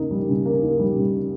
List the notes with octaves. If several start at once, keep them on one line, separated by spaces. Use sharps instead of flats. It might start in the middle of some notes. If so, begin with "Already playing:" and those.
Already playing: C#3 A#3 D#4
G3
C#3
A#3
D#4
G3
C#3
A#3